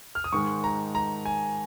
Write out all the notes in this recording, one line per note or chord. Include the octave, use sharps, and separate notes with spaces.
F6
D#6
G#2 D#3 G#3 C#6
A#5
A#5
G#5